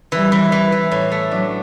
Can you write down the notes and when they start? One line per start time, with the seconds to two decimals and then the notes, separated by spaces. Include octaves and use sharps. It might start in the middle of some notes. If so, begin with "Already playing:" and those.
0.12 E3 G3
0.32 E3
0.52 E3
0.72 E3
0.91 A2
1.12 A3
1.31 F#3 D4